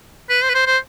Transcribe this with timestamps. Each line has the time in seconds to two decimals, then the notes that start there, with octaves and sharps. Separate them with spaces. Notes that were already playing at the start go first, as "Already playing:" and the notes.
0.29 B4
0.42 C5
0.50 B4
0.54 C5
0.66 C5